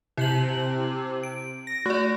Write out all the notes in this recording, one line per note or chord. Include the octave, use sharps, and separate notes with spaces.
C3 E4 G6 F#7
D7
A#6
A3 F#4 D5